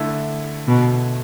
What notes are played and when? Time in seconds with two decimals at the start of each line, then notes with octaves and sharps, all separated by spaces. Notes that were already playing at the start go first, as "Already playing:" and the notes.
Already playing: D3 A3 E4 A4
0.67 B2